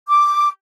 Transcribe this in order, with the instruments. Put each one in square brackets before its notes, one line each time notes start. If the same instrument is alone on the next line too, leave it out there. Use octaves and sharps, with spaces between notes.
[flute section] D6